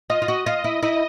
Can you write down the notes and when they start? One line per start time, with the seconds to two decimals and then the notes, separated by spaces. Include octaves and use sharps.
0.10 F4 D#5
0.22 F4
0.28 F#4
0.46 F4 D#5
0.64 E4
0.83 E4 D#5